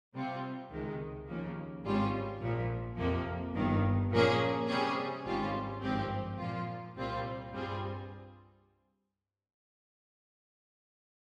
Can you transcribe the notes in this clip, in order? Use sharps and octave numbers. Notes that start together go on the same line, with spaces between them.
C3 G3 C4 F4
C#2 C3 D#3 G#3
D#2 C#3 F3 A#3
G#1 G#2 G3 C#4 F4
A#1 A#2 F3
F2 C3 F3 A#3
G1 G2 D#3
A#2 F3 A#3 C#4 G#4
C3 G3 C#4 G#4
G#1 G#2 G3 C#4 F4
G#1 G2 F3 C4 G4
A#2 F3 A#3 F4
C2 A#2 G3 C4 F4
G2 G3 C4 F4 G#4